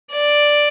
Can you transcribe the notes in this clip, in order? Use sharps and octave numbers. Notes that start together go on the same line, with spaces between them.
D5